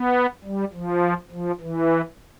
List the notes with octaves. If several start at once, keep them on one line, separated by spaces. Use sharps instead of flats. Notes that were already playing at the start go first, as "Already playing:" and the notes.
Already playing: B3
G3
F3
F3
E3